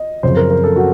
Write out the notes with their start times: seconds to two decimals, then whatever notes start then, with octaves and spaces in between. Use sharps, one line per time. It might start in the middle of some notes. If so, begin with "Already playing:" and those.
Already playing: D#5
0.23 F#2 C#3 F3 C4 C5
0.36 A#4
0.50 A#4
0.64 A4
0.76 F#4